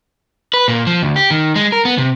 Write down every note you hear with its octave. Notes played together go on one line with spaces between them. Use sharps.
B4
A#2
F3
D2
G4
D#3
G#3
A#4
B3
C3